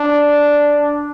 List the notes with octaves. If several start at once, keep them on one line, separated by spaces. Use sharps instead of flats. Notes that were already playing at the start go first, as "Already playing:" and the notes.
Already playing: D4